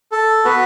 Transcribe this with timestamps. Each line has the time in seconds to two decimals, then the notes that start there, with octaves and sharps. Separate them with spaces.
0.12 A4
0.44 B3 F#4 B4